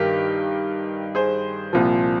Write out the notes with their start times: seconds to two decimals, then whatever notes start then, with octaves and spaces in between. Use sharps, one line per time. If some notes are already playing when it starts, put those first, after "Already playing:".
Already playing: G2 D#3 G4 A#4
1.15 G#4 C5
1.73 C2 A#2 F3